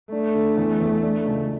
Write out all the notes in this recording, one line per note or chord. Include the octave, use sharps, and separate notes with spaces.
A3 D4
D3
E2
E2
D4
C#2